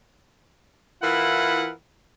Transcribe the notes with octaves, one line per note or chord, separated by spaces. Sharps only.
E3 E4 F4 A#4 F#5 B5